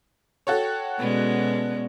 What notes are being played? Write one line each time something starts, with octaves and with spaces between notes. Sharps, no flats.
F#4 A4 C#5 G5
B2 G#3 B3 C#4 D5